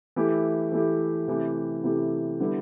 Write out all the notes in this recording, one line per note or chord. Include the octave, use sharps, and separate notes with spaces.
E3 A3 E4 G4
E3 A3 E4 G4
C3 E3 A3 E4 G4
C3 E3 A3 E4 G4
D3 G3 B3 E4 G4